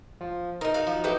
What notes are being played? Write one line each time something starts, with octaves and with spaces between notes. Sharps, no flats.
F3
D#4 A#4 D#5
F#4 F5
F3
A1 F#4 B4 G5